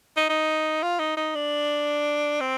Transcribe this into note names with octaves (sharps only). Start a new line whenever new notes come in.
D#4
D#4
F4
D#4
D#4
D4
C4